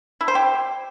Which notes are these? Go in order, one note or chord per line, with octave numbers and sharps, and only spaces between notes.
E4
C5
G4